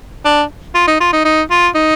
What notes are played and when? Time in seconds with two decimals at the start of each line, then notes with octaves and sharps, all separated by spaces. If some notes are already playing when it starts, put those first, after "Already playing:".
0.25 D4
0.74 F4
0.87 D#4
1.00 F4
1.13 D#4
1.24 D#4
1.50 F4
1.75 D#4